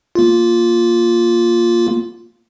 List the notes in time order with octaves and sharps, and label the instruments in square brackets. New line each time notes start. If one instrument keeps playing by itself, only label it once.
[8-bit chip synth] A#3 F4